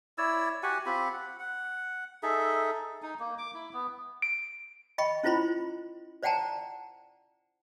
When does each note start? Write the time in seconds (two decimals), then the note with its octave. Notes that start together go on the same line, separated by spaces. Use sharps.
0.18 E4 C#5 D5 E6
0.63 F#4 G4 F#5 G#5
0.86 C4 F4 G4 B5
1.13 F#5
1.39 F#5
2.23 D#4 G#4 A4 E5
3.02 D#4
3.19 A#3
3.38 D6
3.54 E4
3.73 B3
4.22 D7
4.98 D#5 G5 B5 C#6
5.23 C#4 E4 F4 C5 B5 C6
6.23 C5 D5 F#5 G5 A5 A#5